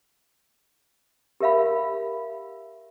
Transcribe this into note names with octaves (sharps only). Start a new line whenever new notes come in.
G4 A#4 E5 F5 B5